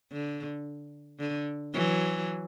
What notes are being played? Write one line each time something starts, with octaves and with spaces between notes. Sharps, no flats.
D3
D3
E3 F#3